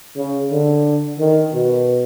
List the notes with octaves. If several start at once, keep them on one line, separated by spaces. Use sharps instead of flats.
C#3
D3
D#3
B2